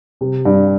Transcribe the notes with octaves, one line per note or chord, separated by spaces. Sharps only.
C3
G2